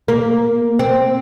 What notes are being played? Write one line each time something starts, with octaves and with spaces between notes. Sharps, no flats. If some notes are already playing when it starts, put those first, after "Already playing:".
A#3
C4